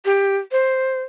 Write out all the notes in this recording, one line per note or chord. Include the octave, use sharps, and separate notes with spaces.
G4
C5